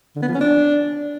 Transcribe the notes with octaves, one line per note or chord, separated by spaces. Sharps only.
D3
B3
F3
C#4
D4